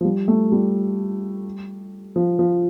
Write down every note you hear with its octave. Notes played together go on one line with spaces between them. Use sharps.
F3
G3
A3
G3
F3
F3